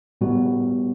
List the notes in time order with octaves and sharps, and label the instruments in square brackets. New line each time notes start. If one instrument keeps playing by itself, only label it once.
[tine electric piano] A2 G3 B3 F#4